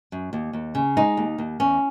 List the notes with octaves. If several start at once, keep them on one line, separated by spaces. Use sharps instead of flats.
F#2
D#2
D#2
C#3
G#3 D#4
D#2
D#2
E2 C#4